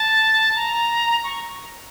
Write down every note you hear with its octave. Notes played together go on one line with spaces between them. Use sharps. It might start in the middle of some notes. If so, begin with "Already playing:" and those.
Already playing: A5
A#5
C#6